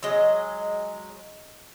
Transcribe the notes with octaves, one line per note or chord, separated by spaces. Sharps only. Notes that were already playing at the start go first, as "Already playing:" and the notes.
F#3 G#3 D#5